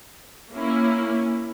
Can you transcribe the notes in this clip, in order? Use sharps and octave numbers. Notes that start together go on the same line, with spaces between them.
A#3 C#4 E4